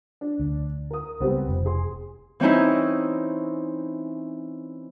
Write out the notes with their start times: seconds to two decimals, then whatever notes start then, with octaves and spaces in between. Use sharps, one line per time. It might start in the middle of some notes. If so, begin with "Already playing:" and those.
0.21 D4
0.40 D2
0.91 A#4 D#6
1.20 C#2 G3 B3 C4
1.49 F1
1.65 G#4 C6
2.40 E3 C4 C#4 D#4 E4